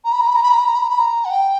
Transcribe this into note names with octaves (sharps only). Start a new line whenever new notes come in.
A#5
B5
A#5
B5
A#5
B5
A#5
B5
A#5
B5
A#5
B5
A#5
F#5
G5